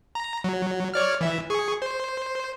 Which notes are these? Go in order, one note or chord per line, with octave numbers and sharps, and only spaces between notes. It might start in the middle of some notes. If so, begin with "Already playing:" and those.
A#5
F#3
C#5 D5 F6
E3 E5
G#4 C#6
C5